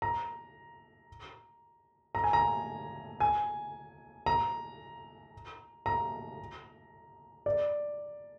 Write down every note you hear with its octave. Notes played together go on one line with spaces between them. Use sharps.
A#5
A#5
G#5
A#5
G#5
A#5
A#5
D5